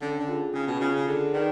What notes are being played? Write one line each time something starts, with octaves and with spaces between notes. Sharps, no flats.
D3 C#4
D3
F4 G#4
C#3 C#4
B2
C#3 F4 G#4
C#3
D3 G#4
D#3 B4 D5